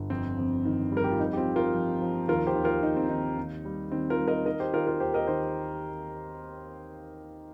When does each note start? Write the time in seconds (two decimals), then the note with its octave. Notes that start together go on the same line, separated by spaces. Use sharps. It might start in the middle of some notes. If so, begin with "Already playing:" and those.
Already playing: G1
0.10 F2 C4
0.38 F2
0.65 D#3
0.92 G3
0.97 A#4
1.04 G4
1.11 F4
1.20 F2 D#4
1.33 G4
1.37 C4 F4
1.47 F2
1.56 F4 A#4
1.74 F3
2.02 F3
2.28 D#2 F4 A#4
2.47 G4 C5
2.55 D#2
2.65 F4 A#4
2.83 D#2 D#4
2.96 C4
3.09 D#3 D#4
3.37 D#2
3.65 G3
3.92 D#3 C4
4.10 F4 A#4
4.19 G3
4.28 A#4 D#5
4.46 D#3 A#4 D#5
4.60 G4 C5
4.73 D#3 F4 A#4
4.87 F4 A#4
5.00 D#2 G4 C5
5.14 A#4 D#5
5.27 D#3 G4 C5